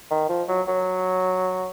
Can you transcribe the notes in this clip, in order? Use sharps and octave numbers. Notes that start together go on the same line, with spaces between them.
D#3
F3
F#3
F#3